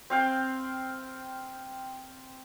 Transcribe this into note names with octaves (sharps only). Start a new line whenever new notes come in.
C4 F5 G5